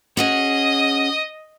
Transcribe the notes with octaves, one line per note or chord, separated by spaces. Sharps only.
C#4 F#4 G#4 D#5